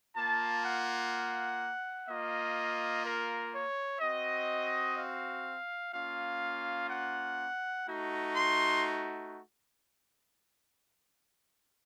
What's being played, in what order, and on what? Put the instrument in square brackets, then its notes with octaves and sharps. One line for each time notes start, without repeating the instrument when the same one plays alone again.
[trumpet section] A#3 F4 A5
F#5
A#3 F4 D#5
A#4
C#5
C4 F#4 D#5
F5
A#3 C#4 F4 F5
F#5
A3 D#4 F#4
C6